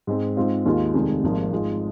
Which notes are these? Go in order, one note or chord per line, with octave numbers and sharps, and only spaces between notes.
G#2 G#3 C4
G#2 G#3 C4 F4
D#2 D#3 G#3 F4
F1 F2 D#3 G#3
G#1 G#2 F3 A#3 F4
G#2 G#3 F4